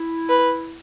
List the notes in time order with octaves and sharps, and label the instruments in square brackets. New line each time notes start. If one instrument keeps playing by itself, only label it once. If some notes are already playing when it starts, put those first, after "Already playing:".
Already playing: [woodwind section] E4
[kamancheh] B4